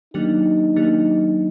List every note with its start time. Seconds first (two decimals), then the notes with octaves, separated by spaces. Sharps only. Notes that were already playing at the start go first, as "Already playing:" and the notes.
0.14 D#3 F#3 A#3 D4 D#4 G4
0.76 D#3 F#3 A#3 D4 G4